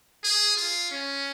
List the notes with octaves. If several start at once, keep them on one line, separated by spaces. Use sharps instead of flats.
G#4
F4
C#4